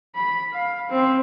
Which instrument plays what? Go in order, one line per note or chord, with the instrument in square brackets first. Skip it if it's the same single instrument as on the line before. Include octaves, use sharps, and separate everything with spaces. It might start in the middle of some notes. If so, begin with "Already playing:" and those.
[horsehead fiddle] B5
F5
C4